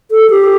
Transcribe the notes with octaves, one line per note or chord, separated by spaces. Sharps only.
A4
G4